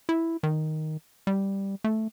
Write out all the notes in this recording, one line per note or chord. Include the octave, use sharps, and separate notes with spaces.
E4
D#3
G3
A3